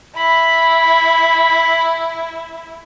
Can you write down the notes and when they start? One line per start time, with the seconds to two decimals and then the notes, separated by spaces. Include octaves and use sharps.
0.16 E4 B5